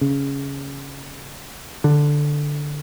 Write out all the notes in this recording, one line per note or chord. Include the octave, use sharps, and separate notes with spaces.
C#3
D3